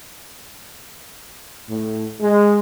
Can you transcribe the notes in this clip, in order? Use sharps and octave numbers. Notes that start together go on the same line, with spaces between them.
A2
G#3